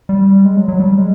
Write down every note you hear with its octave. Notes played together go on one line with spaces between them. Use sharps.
G3
G#3
F#3
F#3
G3
G#3